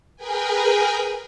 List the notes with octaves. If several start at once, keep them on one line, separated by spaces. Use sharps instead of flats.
G#4 A#4 B4 G5 G#5